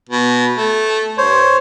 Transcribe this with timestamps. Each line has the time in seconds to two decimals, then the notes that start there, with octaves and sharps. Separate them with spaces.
0.09 B2
0.57 A3
1.18 G2 C5 C#5